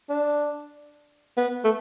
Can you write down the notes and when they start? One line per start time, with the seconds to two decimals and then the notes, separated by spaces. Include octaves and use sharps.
0.09 D4
1.37 B3
1.64 A3